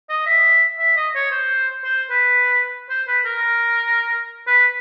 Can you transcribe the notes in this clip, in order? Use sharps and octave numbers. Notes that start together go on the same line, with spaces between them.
D#5
E5
E5
D#5
C#5
C5
C5
B4
C5
B4
A#4
B4